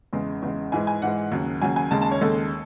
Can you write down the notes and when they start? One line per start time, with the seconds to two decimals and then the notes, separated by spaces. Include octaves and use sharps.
0.13 E2 C#3 G#3
0.42 E2 C#3 G#3
0.72 G#2 E3 G#3 G#5
0.87 G#5
1.02 G#2 E3 G#3 F#5
1.32 D#2 C#3 F#3
1.62 D#2 C#3 F#3 G#5
1.76 G#5
1.91 D#2 C#3 G#3 A5
2.01 A5
2.11 C#5
2.21 D#2 C#3 G#3 A4